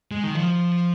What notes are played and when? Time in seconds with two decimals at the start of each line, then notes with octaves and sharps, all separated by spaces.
0.11 G#3
0.24 D#3
0.35 F3